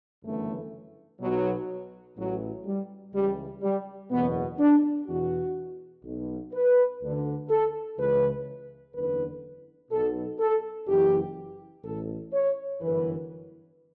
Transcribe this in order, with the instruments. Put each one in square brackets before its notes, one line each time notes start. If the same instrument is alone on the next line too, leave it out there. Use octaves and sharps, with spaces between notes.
[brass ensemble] G1 F#2 C#3 E3 A3
B1 B2 F#3
A1 A2 E3 F#3
G3
C#2 C#3 E3 G3
G3
F#1 E2 B2 B3
D4
E2 B2 F#4
B1 B2
B4
D2 D3
A4
C#2 C#3 E3 B4
F#1 E2 D3 B4
B1 B2 A4
A4
F#1 F#2 E3 G4
A1 A2 E3 A4
C#5
G1 F#2 E3 B4